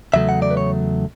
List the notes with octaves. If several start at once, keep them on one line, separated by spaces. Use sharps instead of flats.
E2 C#3 F#3 A3 E5
F#5
D5
B4
C#5